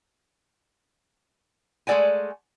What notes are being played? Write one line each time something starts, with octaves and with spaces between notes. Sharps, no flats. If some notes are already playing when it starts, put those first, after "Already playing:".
G#3 A3 A4 D5 F#5 G#5